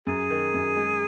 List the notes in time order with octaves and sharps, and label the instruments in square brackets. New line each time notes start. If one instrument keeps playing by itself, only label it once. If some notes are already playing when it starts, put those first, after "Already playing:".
[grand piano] F#2 [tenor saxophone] G#4
[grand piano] D#3
F#2
G#3